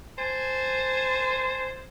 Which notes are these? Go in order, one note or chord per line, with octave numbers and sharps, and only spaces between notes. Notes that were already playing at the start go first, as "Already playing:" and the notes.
C5 G#5 A5